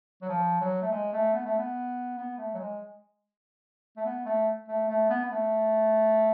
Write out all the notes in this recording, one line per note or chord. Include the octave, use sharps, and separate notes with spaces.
F#3
F3
F#3
A3
G#3
A3
B3
A3
B3
B3
A3
F#3
G#3
A3
B3
A3
A3
A3
B3
B3
A3